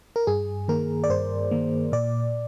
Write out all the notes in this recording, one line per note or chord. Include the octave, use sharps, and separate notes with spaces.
A#4
G2 G#4
D#3 A#3 A#4
D5
G2 C5
D#3 A#3
A#2 D5